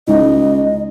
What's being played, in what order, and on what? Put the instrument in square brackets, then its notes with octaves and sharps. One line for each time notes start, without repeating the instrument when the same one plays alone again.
[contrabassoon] C#2 [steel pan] G#3 D#4 E4 [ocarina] D#5